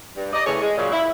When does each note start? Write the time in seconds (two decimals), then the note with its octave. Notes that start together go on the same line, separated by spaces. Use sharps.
0.16 G2
0.33 D5 D#5
0.45 C#3 E3 A3 G#4 C#5
0.61 G#3
0.77 F#2 A#2 C#3
0.92 E4